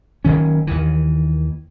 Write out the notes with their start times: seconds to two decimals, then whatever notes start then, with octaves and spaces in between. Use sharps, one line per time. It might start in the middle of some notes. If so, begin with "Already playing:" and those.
0.25 F#1 E2 D#3 C#4
0.67 D#2 D#3 E3